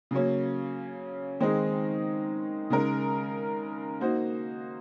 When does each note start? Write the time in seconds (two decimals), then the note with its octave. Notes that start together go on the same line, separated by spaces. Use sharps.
0.11 C#3 F#3 A#3 C#4
1.40 D#3 G#3 C4 D#4 G#4
2.70 C#3 G#3 D#4 A#4
4.00 A#3 D#4 F#4 C5